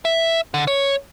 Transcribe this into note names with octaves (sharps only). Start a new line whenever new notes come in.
E5
D3
C#5